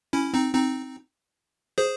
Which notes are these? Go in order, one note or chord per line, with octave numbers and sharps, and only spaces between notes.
C#4 E4
C4 D#4
C4 D#4
G#4 C5